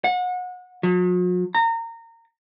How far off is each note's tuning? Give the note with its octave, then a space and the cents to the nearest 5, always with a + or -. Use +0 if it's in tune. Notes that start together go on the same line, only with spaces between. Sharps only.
F#5 -30
F#3 -45
A#5 -25